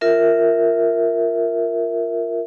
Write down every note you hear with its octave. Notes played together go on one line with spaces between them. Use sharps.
F4 A#4 E5